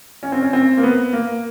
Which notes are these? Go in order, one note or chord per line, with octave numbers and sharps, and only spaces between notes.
C#4
C4
C#4
C4
A#3
B3
A#3